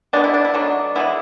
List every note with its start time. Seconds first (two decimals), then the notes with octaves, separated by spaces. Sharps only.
0.13 B2 G#3 B3 D4
0.24 E4
0.34 D4
0.44 E4
0.54 B2 F#3 A3 D4
0.95 E3 G#3 B3 E4